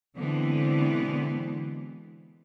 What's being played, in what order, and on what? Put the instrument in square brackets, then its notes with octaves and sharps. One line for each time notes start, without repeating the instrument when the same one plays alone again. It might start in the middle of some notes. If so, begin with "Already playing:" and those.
[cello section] B2 D3 E3 G#3 B3 C4